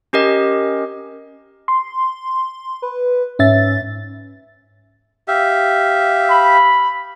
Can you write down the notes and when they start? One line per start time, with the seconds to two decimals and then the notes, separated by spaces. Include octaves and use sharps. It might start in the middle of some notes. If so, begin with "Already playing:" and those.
0.13 C#4 G4 A#4 D#5
1.68 C6
2.82 B4
3.39 G#2 C#4 E5 A6
5.28 G4 E5 F5
6.30 B5